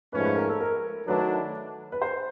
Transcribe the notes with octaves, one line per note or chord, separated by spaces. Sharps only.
G#2 F3 A3 C#4 B4
B4
A#4
A4
A#4
D#3 F#3 A3 D4 B4
B4
C5